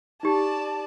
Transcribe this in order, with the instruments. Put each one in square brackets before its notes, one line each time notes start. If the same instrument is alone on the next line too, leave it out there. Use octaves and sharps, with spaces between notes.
[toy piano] D#4 G4 [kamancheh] D5 A5